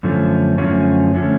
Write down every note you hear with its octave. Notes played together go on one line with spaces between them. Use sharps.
F#2 D3 F3 A3 C#4
F#2 D3 F3 A3 C#4
D3 F3 A3 C#4